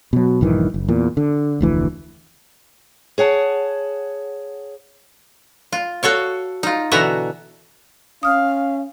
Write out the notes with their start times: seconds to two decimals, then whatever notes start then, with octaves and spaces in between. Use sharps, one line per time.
0.13 B2 F#3
0.41 A#1 G2 D#3 E3
0.74 F#1
0.88 E2 A#2
1.17 D3
1.61 F1 D2 E3
3.18 G#4 C#5 F#5 A5
5.72 F4
6.03 F#4 A4 C#5 F5
6.63 D#4 F4
6.92 B2 D3 E3 F#4 E5 A#5
8.23 C#4 F5 D#6 F6